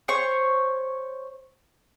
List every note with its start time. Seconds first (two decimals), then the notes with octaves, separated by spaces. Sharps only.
0.08 C5 C#5 C#6